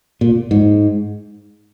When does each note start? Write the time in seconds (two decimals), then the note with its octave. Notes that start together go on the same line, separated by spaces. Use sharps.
0.21 A#2
0.51 G#2